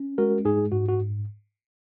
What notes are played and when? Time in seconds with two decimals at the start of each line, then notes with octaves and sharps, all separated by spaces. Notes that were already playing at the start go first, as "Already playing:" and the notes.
Already playing: C#4
0.18 G#3 F#4 A#4
0.45 G#2 D#4 G#4
0.72 G#2 F#4
0.89 F#4